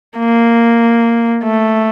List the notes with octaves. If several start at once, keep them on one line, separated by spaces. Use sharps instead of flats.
A#3
A3